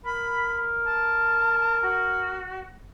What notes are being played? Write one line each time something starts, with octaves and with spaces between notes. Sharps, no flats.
A#4 B5
A5
F#4